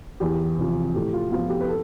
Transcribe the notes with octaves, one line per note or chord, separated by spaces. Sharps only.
E2 G4
C3 F3
A2 G4
F4
F3 B3 F4
G4
B4
A4